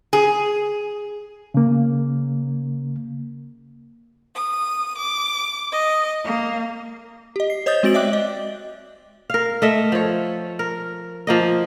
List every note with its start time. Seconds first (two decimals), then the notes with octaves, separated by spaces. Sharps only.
0.13 G#4
1.54 C#3 A#3
4.36 D#6
4.98 D6
5.71 D#5
6.25 A#3
7.36 G4 D#5
7.50 C7
7.66 C5 C#5 D#5 D#6 G6 A6
7.83 G#3 C4 F#4 A6 D7 F#7
7.94 D5 E5 G5 D6 F#6
8.13 D#5
9.30 A#4 F5
9.62 A3 D#5 E5
9.92 F3 C#5
10.59 A#4
11.27 F3 A#3 D#5